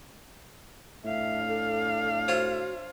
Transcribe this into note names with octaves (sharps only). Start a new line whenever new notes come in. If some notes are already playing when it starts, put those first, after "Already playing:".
A2 D4 E5 F5
A4
F4 F#4 C5 C#5